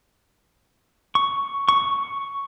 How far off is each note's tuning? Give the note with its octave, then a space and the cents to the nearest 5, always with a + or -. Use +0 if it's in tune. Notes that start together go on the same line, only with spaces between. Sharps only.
C#6 +5
C#6 +5